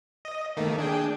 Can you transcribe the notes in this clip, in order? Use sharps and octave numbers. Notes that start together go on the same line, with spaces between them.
D#5
D#3 A3 A#3
D4 G#4 G5